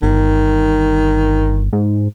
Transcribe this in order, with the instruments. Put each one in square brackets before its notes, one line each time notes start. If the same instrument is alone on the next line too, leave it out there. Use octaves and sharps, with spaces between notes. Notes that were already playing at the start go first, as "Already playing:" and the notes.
[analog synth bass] G1 [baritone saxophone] D#3
[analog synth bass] G#2